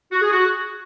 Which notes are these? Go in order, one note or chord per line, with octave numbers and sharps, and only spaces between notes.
F#4
G#4
F#4